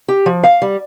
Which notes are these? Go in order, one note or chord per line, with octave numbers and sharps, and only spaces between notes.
G4
F3
F5
G3